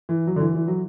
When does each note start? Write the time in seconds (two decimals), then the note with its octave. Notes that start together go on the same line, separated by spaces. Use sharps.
0.09 E3
0.27 F#3
0.36 D3
0.40 E3
0.55 E3
0.68 F#3